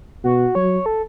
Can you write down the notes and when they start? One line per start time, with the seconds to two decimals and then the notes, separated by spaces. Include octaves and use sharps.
0.24 B2 F#4
0.55 F#3 C#5
0.86 A4